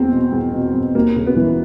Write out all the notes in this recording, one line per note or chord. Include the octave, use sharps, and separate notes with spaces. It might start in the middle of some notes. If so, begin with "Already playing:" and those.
Already playing: E2 A#3 C4
B2
E2
B2
E2
D#2 A#3
C#3
B3
E3